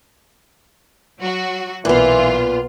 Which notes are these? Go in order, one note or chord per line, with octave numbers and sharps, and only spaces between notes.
F#3 F#4
B1 A#2 E3 B3 F4